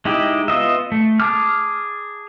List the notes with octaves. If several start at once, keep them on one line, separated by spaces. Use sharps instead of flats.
G#3 D#4 E4 G4 D#5
B3 F4 D#5 E5
A3
G#4 A5 D6 F6